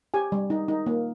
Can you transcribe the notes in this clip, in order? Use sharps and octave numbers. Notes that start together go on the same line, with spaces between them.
G4 G#5
G3
D#4
D#4
A#3